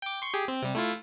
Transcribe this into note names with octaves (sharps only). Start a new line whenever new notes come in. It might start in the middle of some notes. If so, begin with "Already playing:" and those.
G5 D6
C6 C#6
G4 G#4
C4
C3 G3
A3 E4 F4